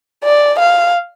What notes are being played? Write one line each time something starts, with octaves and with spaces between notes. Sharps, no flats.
D5
F5